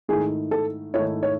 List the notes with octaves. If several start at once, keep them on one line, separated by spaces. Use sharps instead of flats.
G#2 D#3 A3 E4 G#4
A4
G#2 D#3 A3 E4 C#5
C#5